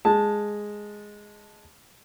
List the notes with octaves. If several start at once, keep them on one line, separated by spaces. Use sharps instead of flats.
G#3 A5